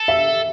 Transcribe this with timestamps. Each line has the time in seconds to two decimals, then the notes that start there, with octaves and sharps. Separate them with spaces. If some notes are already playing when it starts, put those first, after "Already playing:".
Already playing: A4
0.08 E5